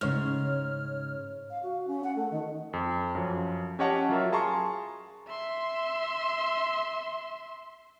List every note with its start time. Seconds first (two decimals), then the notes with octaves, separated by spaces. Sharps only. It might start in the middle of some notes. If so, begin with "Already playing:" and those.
0.01 G#2 C#3 C#5 F6
1.50 F5
1.62 F#4
1.87 C#4
2.03 F#5
2.15 A3
2.30 D#3
2.73 F2
3.15 F#2 F3
3.79 C#4 G4 C#5 D#5 F#5 A5
4.09 F#3 F4 A#4 E5
4.32 G#4 A5 A#5 C6 C#6
5.27 E5 C6